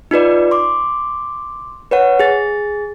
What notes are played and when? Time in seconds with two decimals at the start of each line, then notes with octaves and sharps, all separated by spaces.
0.11 D#4 F4 B4 D5
0.51 C6 D6
1.91 B4 C#5 F#5
2.19 G#4 A6